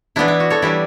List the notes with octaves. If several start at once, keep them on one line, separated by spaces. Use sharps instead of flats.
E3 B3 D4 E4
E4
F#4
A4 C#5
E3 G3 D4 E4